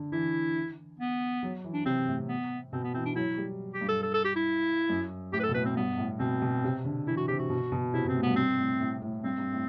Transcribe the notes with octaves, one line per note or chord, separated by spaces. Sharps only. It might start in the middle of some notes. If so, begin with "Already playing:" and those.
Already playing: D3
E3 E4
B3
F#3
E3
D4
C3 C4
A2
B3
B2 C4
B3
E3 C4
D4
F#3 E4
G3
G4
G2
A4
A4
A4
G4
E4
F#2
A2 G4
B4
A4
B2
A2 B4
C4
G2 B3
A2
B2 C4
B2
C3
D3
E3 E4
F#4
C3 G4
F#4
B2
B2
C3 E4
B2
C4
A2
G2 B3
G2 C4
A2
A2
A2
G2 C4
G2
A2